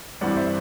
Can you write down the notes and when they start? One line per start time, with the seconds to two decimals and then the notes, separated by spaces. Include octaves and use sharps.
0.21 G2 E3 G3 C4 D5 F#5
0.36 C5 E5